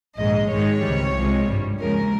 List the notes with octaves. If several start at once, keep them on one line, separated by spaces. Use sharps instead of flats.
A#1 G#2 D#3 G#3 D#5
G#1 G#2 D#3 G#3 C#5
C#2 C3 D#3 G3
C2 C3 F3 G#3
G#1 G2 G3
D#2 C#3 F3 G#3 A#4